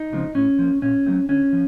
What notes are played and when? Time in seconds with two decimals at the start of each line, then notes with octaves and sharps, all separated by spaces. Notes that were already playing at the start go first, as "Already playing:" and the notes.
Already playing: D#4
0.12 C#3 F3 G#3 C4
0.35 A2 C#4
0.59 F3 A#3
0.82 A#2 C#4
1.06 F#3 A3 C4
1.29 D3 C#4
1.53 F3